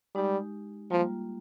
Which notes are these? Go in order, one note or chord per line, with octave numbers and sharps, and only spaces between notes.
G3 G#3 D#4 G4
F3 G3 A#3 F4